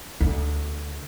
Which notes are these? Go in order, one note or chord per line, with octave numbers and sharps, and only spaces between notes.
D2